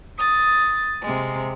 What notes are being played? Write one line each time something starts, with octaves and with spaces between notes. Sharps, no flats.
D#6 A6
C3 G#3